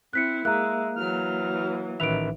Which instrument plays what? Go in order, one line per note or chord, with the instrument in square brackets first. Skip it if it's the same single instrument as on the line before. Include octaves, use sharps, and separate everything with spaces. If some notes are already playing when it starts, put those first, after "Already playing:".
[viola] C4 E4 [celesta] F#6 B6 C#7
[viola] G#3 [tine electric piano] A#3 [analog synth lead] E5 [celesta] A#5 F#6
[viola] E3 F#3 [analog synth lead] F6
[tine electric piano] A1 B4 E5 [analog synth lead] D#3 [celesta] D7 F7